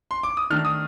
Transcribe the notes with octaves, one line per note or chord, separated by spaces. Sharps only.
C6
D6
D#6
D#3 A3 D4 F6
D#6